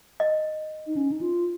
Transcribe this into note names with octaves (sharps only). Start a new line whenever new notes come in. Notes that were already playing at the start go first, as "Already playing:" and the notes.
D#5
D#4
C#4
D#4
F4